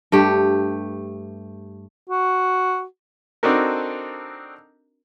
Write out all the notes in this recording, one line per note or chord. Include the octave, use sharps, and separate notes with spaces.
G2 A3 G4
F#4
C4 D4 D#4 F#4 A4 A#4